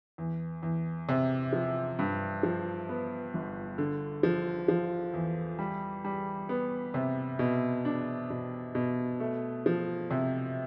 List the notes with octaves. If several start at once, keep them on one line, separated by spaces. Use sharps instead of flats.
E2
E2
C3
F3
G2
F3
B3
G1
D3
F3
F3
E2
G3
G3
B3
C3
B2
D4
B2
B2
A3
F3
C3